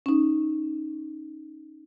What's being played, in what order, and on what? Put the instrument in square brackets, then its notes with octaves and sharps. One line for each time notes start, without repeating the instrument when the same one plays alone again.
[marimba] C#4 D#4